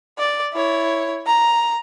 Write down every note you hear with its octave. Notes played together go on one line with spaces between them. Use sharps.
D5
E4 C#5
A#5